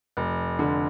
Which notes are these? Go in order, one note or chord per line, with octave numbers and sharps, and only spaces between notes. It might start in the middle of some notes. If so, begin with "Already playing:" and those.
F1
D3